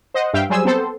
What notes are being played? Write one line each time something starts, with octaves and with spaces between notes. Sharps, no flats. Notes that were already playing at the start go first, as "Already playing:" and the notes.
C5 D#5 F#5
G2 E5 F5 G5
F#3 G3 G#4 C5 G#5 E6
B3 C4 A4 C5